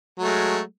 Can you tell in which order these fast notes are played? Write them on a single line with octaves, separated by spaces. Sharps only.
F#3 A3 G#3